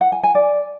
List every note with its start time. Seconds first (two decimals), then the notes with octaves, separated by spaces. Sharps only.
0.01 F#5
0.12 G#5
0.23 G#5
0.35 D5